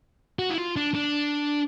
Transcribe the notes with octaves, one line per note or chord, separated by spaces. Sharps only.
F#4
E4
F4
D4
D4